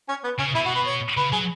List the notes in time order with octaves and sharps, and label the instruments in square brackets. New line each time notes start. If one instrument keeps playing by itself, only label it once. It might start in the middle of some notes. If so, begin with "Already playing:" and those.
[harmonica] C#4
B3
[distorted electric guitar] C#3 [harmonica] C#4
[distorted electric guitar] B2 [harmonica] E4
[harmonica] F#4
B4
C#5
[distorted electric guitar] C#3 [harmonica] B4
[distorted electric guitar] F#3 [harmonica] G#4